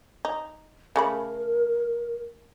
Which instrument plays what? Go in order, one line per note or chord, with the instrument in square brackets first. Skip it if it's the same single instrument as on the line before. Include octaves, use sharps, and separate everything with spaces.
[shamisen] D#4
[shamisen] C#3 A3 B5 [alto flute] A#4